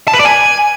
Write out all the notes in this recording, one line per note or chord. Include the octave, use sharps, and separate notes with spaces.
A5
B4
D5
G#5